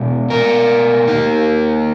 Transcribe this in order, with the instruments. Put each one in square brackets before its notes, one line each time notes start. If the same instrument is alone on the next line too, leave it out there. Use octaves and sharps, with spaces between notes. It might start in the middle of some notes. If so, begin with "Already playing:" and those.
Already playing: [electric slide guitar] B2 G#3 B3
A#4
D#3 A#3